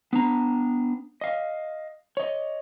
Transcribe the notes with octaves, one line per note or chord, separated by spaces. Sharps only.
B3 D4 A#5
D#5 F5
C#5 D#5